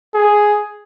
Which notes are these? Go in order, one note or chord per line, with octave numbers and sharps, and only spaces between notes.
G#4